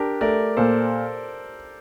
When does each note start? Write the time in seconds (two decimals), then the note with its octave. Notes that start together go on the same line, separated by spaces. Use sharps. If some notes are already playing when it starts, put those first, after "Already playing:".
Already playing: D4 G4 A#4
0.21 A3 A#4 D5
0.57 A#2 A4 C5